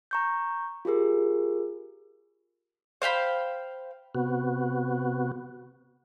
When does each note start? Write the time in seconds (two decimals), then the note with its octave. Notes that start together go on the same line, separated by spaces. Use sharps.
0.11 A#5 C#6 G6
0.85 F4 G4 G#4 A#4
3.02 C5 F5 G5 B5
4.15 C3 B3 F#4